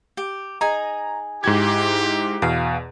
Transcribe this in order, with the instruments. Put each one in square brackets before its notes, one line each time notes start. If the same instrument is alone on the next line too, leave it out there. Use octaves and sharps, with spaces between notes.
[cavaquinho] G4
[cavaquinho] D#4 G#4 G#5 [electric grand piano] A#5
[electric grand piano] G#2 G#6 [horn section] E4 G4
[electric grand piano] E2 B2 [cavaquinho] F5